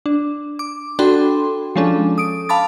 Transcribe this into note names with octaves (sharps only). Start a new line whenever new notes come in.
D4
D6
D4 F#4 A4 G5 B5 C6
F3 G#3 C#4 D4 A4
D#6 D7
F5 A5 B5 D6 A6